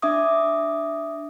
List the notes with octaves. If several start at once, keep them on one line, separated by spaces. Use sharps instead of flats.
D4 E5 D6 D#6